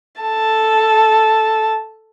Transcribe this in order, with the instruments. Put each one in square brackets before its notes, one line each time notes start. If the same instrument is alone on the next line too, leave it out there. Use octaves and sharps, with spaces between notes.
[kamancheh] A4 A5